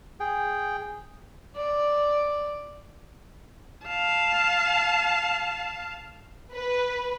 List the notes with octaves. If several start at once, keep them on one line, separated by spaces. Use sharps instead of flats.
G#4 G5
D5
F5 A5
B4